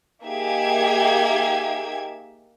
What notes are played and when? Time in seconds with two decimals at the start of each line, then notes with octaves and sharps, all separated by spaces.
0.23 A#3 D#4 G4 G#4 E5 G#6